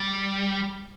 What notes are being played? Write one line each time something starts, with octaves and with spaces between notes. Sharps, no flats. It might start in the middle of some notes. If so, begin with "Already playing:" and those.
Already playing: G3